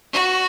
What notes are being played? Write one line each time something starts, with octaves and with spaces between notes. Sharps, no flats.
F#4